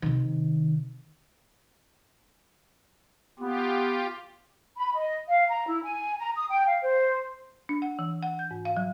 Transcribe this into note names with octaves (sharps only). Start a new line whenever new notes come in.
C3 D#3
B3 F4 G4
B5
D#5
F5
A#5
E4
G#5
A#5
D#6
G5
F5
C5
D4
F#5
E3
F#5
G6
G#2
F5
F#3